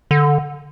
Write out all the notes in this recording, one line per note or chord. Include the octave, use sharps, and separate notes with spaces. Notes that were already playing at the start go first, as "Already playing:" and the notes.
D3